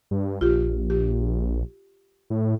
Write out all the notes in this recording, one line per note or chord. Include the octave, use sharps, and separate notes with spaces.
G2
A#1 F4 G4
G4
A2